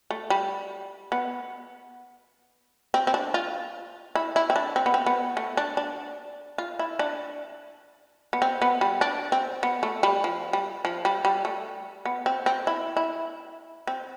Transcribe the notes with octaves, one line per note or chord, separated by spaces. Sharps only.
A3
G3
B3
C4
C4
D4
F4
E4
E4
C4
D4
C4
B3
C4
B3
A3
D4
D4
F4
E4
D4
B3
C4
B3
G3
D4
C4
B3
A3
G3
F3
G3
F3
G3
G3
A3
B3
C4
C4
E4
E4
C4